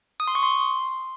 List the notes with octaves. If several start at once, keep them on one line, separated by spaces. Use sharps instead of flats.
D#6
C6
C#6
C6